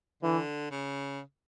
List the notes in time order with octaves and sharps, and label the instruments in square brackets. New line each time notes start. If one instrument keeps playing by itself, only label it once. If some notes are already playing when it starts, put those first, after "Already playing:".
[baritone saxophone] D3 [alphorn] E3
[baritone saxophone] C#3